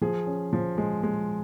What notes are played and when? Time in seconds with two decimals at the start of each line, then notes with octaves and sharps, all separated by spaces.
0.02 F3 G#4
0.27 C#4
0.53 F3
0.78 G#3
1.03 G#3